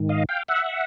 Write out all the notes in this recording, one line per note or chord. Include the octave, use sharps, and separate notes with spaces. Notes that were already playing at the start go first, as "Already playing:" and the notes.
Already playing: G#2 D#3
D#5 F5
F5 G5
E5 F#5